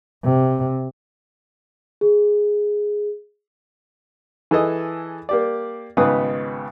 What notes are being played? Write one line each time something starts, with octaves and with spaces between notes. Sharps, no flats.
C3
G#4
E3 G#4 A4 D#5
A#3 G4 D5
G#1 C#3 B3 B4 D#6